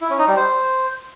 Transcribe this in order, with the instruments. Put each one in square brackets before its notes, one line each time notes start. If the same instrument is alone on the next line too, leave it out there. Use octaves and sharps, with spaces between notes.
[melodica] E4
C#4
D#4
G3
C5